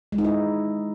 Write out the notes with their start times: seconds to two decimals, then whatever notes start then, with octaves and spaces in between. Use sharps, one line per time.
0.12 G#3
0.18 D#4
0.24 E4